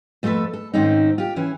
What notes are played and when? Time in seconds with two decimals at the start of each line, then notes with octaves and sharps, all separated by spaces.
0.23 F2 A3 C4 G#4 A4 B4
0.53 A4
0.73 G#2 D#3 C4 C#4 D#4
1.18 F4 G4
1.36 E3 C#4 E4